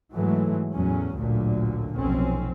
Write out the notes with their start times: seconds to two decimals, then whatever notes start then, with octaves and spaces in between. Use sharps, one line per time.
0.13 G#2 E3 F#3 G#3 A3
0.73 E2 A2 F#3 C#4
1.17 A1 D2 A#2 D3 F#3
1.96 F1 B1 C4 C#4